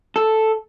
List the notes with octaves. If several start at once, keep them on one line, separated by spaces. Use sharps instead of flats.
A4